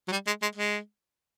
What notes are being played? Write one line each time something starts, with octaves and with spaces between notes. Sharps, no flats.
F#3
G3
G#3
G#3
G#3